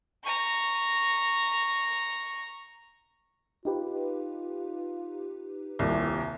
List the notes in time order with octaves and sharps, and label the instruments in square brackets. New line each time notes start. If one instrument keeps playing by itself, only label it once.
[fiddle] A#5 C#6
[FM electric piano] D#4 G4 B4 [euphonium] F4
[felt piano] D#1 C2